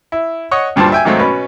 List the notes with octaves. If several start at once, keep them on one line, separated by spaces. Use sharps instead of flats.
E4
C#5 D#5 F#5
D2 G2 A#2 C5 A5
E5 G5 G#5
G#2 D#3 F#3 A3 A#3 C4
B2 C#4 B4